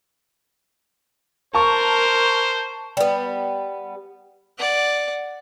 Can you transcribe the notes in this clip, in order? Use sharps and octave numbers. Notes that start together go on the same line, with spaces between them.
A#4 C5 A5 C#6
G3 B3
D5 F#5